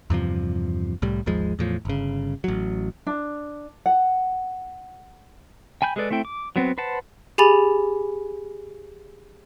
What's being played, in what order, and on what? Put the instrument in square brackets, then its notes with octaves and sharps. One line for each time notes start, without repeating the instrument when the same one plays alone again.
[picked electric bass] E2 G2 C3 F3
C2 A2 G3
G#1 D#2 F3 G#3
E2 A2 F3
G1 C#3
A1 F#3
[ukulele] D4
F#5
[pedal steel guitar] G5 G#5 B5 G6
G#3 G#4 A4 B4 D5
A3 C4 E4 G5
D6
F#3 B3 C4
B4 C5 F#5 A5
[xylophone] G4 G#4 G#5 B5 A6 F7